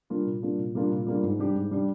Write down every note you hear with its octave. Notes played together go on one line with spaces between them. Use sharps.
G3 A#3 D4 F4
A#2
G3 A#3 D4 F4
A#2
G3 A#3 D4 F4
A#2
G3 A#3 D4 F4
G#2
G3 D4 G4
G#2
G3 D4 G4